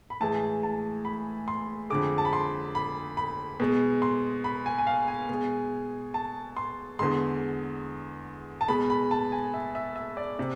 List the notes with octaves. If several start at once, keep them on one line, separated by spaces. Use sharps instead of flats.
B5
A2 E3 G#3 A5
A5
B5
C6
F2 D3 G#3 D6
A5
B5
C6
B5
B5
B2 G#3
C6
B5
G#5
G#5
F5
G#5
B2 G#3
A5
C6
E2 D3 G#3 C6
A5
B2 G#3 B5
B5
A5
G#5
E5
E5
E5
D5
C3